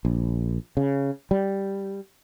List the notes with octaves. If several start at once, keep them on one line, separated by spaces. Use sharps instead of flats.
A#1
C#3
G3